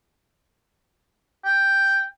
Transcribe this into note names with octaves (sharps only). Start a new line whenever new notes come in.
G5